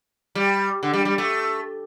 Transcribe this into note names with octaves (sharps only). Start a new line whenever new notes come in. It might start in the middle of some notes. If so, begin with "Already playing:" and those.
G3
D3
G3
G3
A3